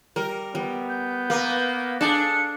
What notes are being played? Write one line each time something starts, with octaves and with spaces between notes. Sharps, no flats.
G3 A#4
G3 B3
G6
A#3 B4 G#5
D4 G#4 A4 A5 C#7